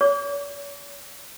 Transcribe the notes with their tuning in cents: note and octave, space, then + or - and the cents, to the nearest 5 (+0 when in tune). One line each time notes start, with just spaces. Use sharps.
C#5 +35 D6 -40